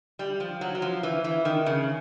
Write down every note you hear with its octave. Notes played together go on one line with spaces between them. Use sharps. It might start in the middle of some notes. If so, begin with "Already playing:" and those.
G3
F3
F#3
F#3
F3
E3
E3
D#3
C#3